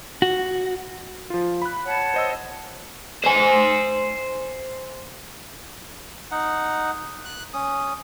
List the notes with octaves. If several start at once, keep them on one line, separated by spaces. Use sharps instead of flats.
F#4
F3 F4
B5 F#6
C#5 F#5 A5
C5 D#5 E6
C5 G#5
D#4 F#5
F#6
C#4 D#6